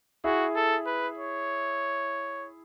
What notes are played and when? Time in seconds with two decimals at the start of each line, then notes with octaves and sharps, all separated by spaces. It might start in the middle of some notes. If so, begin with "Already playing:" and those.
0.24 E4 F#4 G#4
0.56 A4
0.86 B4
1.18 C#5